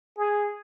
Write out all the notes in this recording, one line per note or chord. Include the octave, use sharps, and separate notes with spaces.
G#4